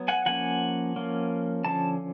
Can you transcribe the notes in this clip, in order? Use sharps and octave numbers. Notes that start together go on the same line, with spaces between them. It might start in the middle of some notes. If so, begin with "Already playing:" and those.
Already playing: F#3 B3
F#5 G#5
F3 A#3 C#4 F#5 G#5
F3 A#3 C#4
D3 F3 C#4 A5